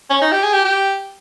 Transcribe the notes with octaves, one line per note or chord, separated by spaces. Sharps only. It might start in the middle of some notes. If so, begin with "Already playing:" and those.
C#4
D#4
G4
G#4
G4
G4